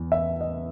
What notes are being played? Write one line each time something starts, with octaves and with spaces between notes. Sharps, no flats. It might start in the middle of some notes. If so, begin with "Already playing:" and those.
Already playing: E2
E5
D#5